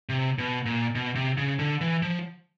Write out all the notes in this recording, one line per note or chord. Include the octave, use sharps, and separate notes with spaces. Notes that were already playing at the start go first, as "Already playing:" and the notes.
C3
B2
A#2
B2
C3
C#3
D3
E3
F3